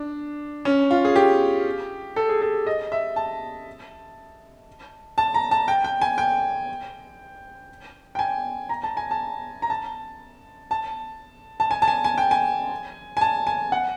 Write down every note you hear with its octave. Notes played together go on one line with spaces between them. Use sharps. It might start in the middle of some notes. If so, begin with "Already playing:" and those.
Already playing: D4
C#4
F4
G#4
G4
A4
G#4
A4
D#5
E5
A5
A5
A#5
A5
G5
G5
G#5
G5
G5
G#5
A#5
A5
G#5
A5
A#5
A5
A5
A5
G#5
A5
G#5
G#5
G5
G#5
G#5
A5
G#5
F#5